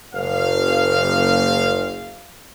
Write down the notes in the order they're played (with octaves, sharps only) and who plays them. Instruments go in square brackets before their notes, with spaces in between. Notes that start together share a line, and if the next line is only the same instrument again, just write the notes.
[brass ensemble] F#1 F5